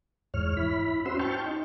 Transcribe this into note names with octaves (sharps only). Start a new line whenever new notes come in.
E2 G#2 C#5 F6
E4 B5
C#4 F#4 C5 C6 E6
G5 A5 C#6 F6 G6
D#4